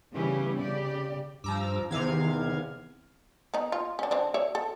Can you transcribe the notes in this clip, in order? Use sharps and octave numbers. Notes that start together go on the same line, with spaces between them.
C#3 E3 G3 B3 C#4 G4
C#3 G4 D5
G2 F3 A#5 D6 E6
E2 C3 D#3 B3 F5 G#6
B3 D#4
F4
C#4 D4
D3 C4 D4
C#5 D5 E5
A4